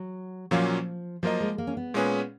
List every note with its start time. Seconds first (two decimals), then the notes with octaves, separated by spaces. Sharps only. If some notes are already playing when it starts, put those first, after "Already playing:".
Already playing: F#3
0.51 A#2 F3 F#3 A#3 C#4 F4
1.23 F3 F#3 A#3 F4 A#4 D#5
1.40 G#3
1.58 A#3
1.67 C#4
1.77 B3
1.94 A#2 G#3 C#4 G#4 B4